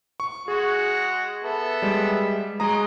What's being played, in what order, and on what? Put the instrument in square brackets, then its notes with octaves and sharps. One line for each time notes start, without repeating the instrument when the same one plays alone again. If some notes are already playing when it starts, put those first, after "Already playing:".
[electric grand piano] C#6
[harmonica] G#3 F#4 [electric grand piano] G#4
[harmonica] B3 A4 E5
[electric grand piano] G3 G#3
[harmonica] F#3 D#6 [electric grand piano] G#3 A#5